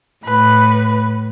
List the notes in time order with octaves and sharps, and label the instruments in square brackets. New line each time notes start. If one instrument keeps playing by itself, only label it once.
[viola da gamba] A2 [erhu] B4